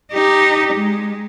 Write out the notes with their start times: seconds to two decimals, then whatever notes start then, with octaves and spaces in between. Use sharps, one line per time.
0.13 D#4 G4
0.74 G#3